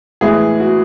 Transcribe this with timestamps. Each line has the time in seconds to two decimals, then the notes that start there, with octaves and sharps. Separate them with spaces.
0.21 A2 E3 G#3 G#4
0.60 F#4